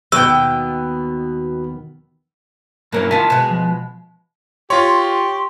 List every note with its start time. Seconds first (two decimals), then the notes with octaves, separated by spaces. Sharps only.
0.12 D#2 B2 D#3 B3 G5 E6
2.92 G2 F#3 A#3 C#4 E4 A#4
3.11 D#3 F4 E5 G#5 A5
3.30 B2 G#3
3.51 F3
4.70 F4 G4 C#5 C6 C#6